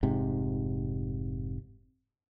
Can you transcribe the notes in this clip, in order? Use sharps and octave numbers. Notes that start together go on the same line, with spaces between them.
F1 G#2 C3